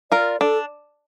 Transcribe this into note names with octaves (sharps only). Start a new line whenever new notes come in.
F4 A#4 D5
D4 A4